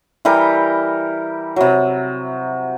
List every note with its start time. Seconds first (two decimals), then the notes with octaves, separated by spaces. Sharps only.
0.25 E3 G3 G4 A#4
1.56 C3 F#3